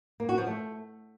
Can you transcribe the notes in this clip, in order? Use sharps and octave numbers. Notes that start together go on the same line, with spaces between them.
A#3
F#4
F3
A3